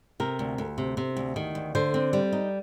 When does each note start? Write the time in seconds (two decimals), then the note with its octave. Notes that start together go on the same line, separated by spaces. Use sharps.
0.20 C3 A#4
0.39 D2
0.58 D2
0.78 C3
0.97 C3
1.17 D2
1.36 D#3
1.55 D2
1.75 D3 C5
1.94 C4
2.13 G3
2.33 D#4